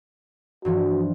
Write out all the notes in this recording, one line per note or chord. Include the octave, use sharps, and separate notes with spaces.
G2 E3 F3 F#4